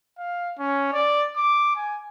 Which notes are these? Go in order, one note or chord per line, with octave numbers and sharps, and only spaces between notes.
F5
C#4
D5
D6
G#5